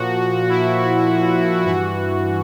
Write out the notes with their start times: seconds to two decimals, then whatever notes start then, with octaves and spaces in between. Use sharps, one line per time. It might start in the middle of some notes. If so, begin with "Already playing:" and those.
Already playing: A#2 F3 F#4
0.49 E4
1.65 G2 E3 F#4